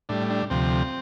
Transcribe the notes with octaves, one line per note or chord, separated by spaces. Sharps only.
A2 G3 D4
D4
D2 C3 F3 C4